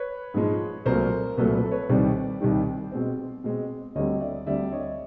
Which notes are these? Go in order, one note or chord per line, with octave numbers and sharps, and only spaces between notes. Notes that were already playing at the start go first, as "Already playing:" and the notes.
Already playing: B4 C#5
G#2 F3 G#3
C2 A#2 F#3 A3 A#4 C5
C2 A#2 F#3 A3 A4 B4
A4 B4
B4 C#5
C2 C3 D#3 G3 C5 D5
C2 C3 D#3 G3
B2 G#3 C4
B2 G#3 C4
D2 D3 G3 C4 C#5 D#5
D5 E5
D2 D3 G3 C4 D5 E5
C#5 D#5